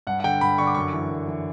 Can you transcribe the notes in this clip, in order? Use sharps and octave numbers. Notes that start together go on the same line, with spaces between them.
G2 F#5
F#5
D3 G5
G2 B5
D3 C#6
D6
F#2 C#6
E3
F#2
E3